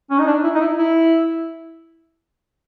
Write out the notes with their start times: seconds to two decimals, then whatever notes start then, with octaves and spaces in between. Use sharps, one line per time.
0.11 C#4
0.19 D#4
0.27 D4
0.44 E4
0.55 D#4
0.61 E4
0.77 E4